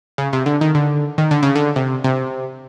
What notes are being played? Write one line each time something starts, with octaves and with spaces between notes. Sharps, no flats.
C#3
C3
D3
D#3
D3
D#3
D3
C#3
D3
C3
C3